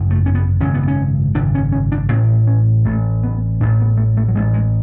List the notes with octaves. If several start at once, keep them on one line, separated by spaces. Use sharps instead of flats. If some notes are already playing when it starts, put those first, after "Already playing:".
Already playing: G#1 F#2 C#3
A3
C#4
B3
G#1 F#2 C#3 C#4
B3
C#4
G#1 F#2 C#3 D4
C#4
C#4
D4
A1 A2 C#4
C#4
A1 A2 A3
B3
A1 A2 D4
B3
A3
A3
F#3
A1 A2 G#3
G#3